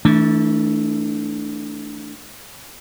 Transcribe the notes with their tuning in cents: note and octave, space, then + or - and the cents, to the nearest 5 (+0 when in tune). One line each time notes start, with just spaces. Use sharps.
E3 -40 A3 +0 D4 -5